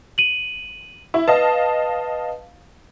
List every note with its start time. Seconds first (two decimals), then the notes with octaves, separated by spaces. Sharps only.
0.18 D#7 F#7
1.14 E4
1.28 B4 D#5 F5 A5